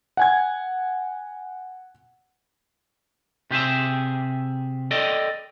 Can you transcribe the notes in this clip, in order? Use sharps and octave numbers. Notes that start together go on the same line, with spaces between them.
F#5 G#5 G#6
C3 G4 G#4 E5
A4 D5 D#5 G5